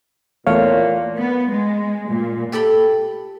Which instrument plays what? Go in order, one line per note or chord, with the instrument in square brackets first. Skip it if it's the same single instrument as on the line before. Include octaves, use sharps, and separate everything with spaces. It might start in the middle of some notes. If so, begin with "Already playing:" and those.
[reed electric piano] E2 A3 C#5 [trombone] A#2 [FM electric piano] F5
[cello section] B3
G#3
A#2
[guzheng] G4 A4 G5 B5